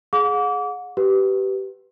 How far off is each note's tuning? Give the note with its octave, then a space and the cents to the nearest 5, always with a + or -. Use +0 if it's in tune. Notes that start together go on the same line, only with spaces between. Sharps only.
G#4 +15 F#5 -40 D6 -35
G4 -20 B4 +0